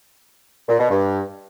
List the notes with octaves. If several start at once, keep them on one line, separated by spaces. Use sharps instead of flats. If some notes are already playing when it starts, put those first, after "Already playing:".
A#2
B2
G2